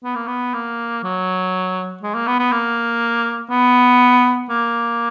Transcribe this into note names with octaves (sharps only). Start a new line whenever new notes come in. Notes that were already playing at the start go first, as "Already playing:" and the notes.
B3
A#3
B3
A#3
F#3
G#3
A#3
B3
B3
A#3
B3
A#3